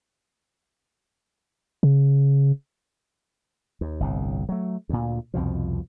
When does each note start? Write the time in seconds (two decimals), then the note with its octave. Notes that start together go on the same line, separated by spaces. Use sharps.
1.83 C#3
3.81 D#2
4.00 G1 C2 A2
4.49 F#3 A3
4.89 D2 A#2
5.34 C2 F2 B2 F3